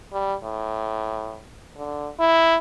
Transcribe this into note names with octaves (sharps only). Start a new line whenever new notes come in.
G3
A2
D3
E4